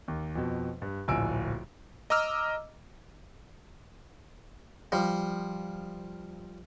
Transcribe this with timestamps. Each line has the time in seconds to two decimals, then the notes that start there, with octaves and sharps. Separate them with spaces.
0.08 D#2
0.36 F2 B2
0.82 G2
1.08 D1 A#1 G#5 E6 D7
2.10 D#5 A#5 D6 E6 F6
4.92 F3 G3